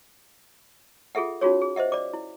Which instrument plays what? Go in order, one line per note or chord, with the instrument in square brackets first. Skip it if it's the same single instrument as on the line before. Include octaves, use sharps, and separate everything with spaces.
[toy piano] F4 G#4 A4 E5 F#5
C#4 D#4 F4 F#4 G#4 C#5
G#4
C5 D#5 E5 F#5
D5 D6
E4